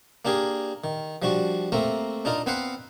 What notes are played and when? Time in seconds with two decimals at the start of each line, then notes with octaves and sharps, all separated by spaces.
0.25 A#3 D4 G4 G#4 A#4
0.84 D#3
1.22 F3 G3 D4 F#4
1.72 A3 A#3 C4 A#4
2.25 D4 D#4 F4 A#4
2.46 B3 C4 B4 C5 F5 F#5